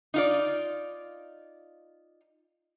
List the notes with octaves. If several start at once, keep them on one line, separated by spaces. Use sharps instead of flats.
D#4 F4 D5